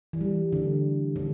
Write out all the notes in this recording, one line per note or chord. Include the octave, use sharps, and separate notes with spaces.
E3
G3
D3
D3